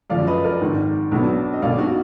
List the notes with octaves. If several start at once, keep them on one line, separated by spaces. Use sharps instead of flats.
F#2 F3 G#3 D5 F5
B4 D#5
A#4 D5
G#1 G#2 D#3
B1 B2 F#3 B3 D4
D#5
B1 B2 A#3 D5 F5
D#4 F#4